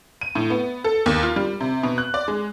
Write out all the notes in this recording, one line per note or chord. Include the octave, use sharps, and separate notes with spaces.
D#7
A2
B3
A4
D#2
F4
G3
C3
B2
F#6
D5
G#3